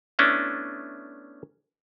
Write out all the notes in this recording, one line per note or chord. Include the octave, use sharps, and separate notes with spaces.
A3 B3 C#4 D4 E4